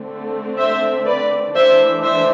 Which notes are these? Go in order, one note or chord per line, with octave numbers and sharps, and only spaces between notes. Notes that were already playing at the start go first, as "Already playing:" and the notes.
Already playing: D3 A3 C4
C5 E5
B4 D5
E3 A3 D4 C5 E5
C5 E5